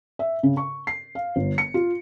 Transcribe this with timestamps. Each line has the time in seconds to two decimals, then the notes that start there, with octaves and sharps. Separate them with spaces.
0.19 E5
0.43 C#3
0.57 C#6
0.87 C7
1.15 F5
1.36 G1
1.58 C#7
1.74 F4